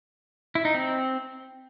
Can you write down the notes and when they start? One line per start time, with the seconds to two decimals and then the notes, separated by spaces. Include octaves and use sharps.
0.55 E4
0.65 D#4
0.74 C4